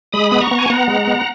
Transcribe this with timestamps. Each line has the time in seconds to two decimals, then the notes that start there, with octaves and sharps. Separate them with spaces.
0.12 G#3 B5 D#6
0.31 B3 D#6
0.41 A#5 C#6
0.51 B3
0.58 G#5
0.69 B3 F#5 A#5
0.88 G#3
1.07 B3